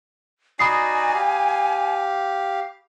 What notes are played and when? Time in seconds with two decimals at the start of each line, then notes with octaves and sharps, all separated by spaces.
0.59 D#4 F#4 D5 G#5 B5 D#6 C7
1.14 G4 F5